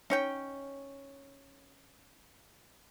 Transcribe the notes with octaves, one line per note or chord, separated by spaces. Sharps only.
C#4 D#4 C#5 G5